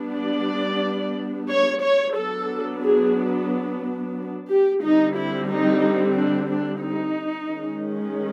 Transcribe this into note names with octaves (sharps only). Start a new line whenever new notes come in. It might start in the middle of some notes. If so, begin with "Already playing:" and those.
Already playing: G3 B3 D4
D5
C#5
C#5
F#3 B3 D4 A4
G#4
G4
D3 G3 C4 D#4
E4
D#4
D4
D4
D#4
D#3 G#3 C#4